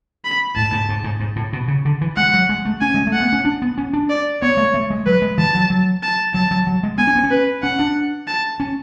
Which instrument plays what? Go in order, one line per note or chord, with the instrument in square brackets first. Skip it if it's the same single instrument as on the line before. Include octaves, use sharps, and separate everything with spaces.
[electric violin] B5
[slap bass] A2 [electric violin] A5
[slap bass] G#2
G#2
G#2
G#2
A2
B2
C#3
D3
E3
[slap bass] G#3 [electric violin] F#5
[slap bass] F#3
G#3
A3
[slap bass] C#4 [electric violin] G#5
[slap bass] G#3
A3
[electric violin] F#5
[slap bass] B3
C#4
D4
B3
C#4
D4
[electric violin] D5
[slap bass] B3 [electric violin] C#5
[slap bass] A3
A3
G#3
[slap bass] F#3 [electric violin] B4
[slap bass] G#3
[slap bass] E3 [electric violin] A5
[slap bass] F#3
F#3
[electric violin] A5
[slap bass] F#3 [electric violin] A5
[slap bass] F#3
F#3
G#3
[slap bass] B3 [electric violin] G#5
[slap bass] C#4
B3
C#4
[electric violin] B4
[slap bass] C#4 [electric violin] F#5
[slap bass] D4
[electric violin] A5
[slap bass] C#4